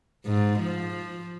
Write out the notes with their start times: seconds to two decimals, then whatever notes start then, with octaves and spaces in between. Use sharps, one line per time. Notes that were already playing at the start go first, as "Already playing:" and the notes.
0.26 G#2
0.60 F3